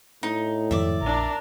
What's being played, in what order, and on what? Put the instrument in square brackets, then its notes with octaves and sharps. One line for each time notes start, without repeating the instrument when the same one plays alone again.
[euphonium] A2 [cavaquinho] D#4
[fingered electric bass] F2 G#2 D#3 [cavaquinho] D5 E5
[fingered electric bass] A#1 [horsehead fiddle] D4 A#4